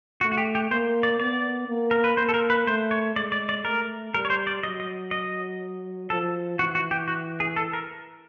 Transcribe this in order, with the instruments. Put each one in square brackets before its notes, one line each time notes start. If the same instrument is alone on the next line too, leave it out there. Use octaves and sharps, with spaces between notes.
[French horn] A3 [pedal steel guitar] F#4
[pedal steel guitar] F#4
G4
G4
[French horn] A#3 [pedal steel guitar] C5
[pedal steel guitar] D5
[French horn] B3 [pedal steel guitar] D5
[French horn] A#3
[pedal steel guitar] A#4
B4
[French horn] A#3 [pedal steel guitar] C5
[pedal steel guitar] A4
A#4
B4
[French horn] A3 [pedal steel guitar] C5
[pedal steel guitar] C#5
[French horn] G#3 [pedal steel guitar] D5
[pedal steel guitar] D5
D5
[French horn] A3 [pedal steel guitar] A#4
[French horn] G3 [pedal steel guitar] A#4
[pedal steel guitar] C#5
C5
D5
[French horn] F#3 [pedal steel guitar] D#5
[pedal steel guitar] D#5
D#5
[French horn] F3 [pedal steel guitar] A4
[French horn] E3 [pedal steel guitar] F#4
[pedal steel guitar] F#4
G4
F#4
G#4
A4
A#4